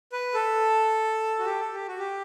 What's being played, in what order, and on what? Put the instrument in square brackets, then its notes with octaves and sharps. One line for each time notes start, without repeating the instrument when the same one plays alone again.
[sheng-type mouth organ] B4
A4
F#4
G4
A4
G4
F#4
G4